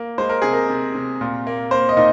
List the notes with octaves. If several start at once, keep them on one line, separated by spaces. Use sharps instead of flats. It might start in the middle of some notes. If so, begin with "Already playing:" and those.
Already playing: A#3
G#3 C5
A#4
C3 G#4
A#4
C3
C3
A#2
A#3
A#3 C5
D#5
A#2 D#4